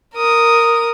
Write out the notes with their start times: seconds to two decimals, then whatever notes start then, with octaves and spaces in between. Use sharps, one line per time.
0.16 A#4 D#6